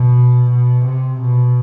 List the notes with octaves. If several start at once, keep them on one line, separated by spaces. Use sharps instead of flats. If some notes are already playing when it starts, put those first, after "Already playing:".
Already playing: B2
B2
C3
B2